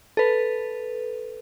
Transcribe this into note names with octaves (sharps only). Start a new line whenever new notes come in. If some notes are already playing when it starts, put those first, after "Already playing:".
A4 B4